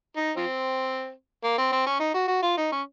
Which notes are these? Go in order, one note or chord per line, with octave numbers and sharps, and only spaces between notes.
D#4
F3 C4
A#3
C4
C4
C#4
D#4
F#4
F#4
F4
D#4
C#4